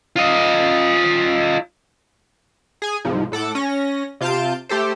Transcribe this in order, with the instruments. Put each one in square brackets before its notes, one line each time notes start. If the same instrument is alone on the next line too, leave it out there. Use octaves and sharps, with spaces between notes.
[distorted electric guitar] F4 D#5
[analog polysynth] G#4 G#5
C2 G#2 F3
A2 A4 F#5 D6
C#4 A#6
C3 F4 F5 A5 G6 D7
A3 G4 A4 C5